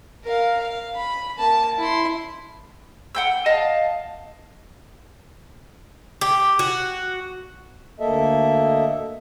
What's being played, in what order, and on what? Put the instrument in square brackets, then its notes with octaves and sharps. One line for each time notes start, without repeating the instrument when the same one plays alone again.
[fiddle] A#4 F5
F5
B5
A#3 A5
E4 C6
[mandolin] F#5 G5 E6
D#5 F5 A5
[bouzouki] G4
F#4
[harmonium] D2 A#3 A4 D#5 E5